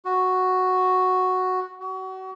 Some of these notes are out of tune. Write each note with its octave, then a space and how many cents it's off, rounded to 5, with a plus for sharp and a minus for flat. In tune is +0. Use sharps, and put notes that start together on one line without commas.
F#4 +0
F#4 +30